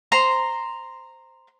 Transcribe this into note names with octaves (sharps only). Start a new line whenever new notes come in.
C5 A#5 C6